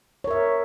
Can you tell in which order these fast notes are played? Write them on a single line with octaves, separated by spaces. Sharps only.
C#5 A#4 E5